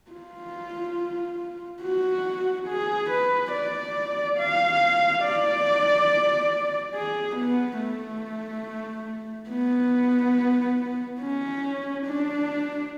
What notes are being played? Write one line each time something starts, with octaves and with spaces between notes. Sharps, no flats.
F4
F#4
G#4
B4
D5
F5
D5
G#4
B3
A3
B3
C#4
D4